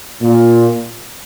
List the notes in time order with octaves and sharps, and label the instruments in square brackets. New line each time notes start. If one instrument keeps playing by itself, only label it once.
[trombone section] A#2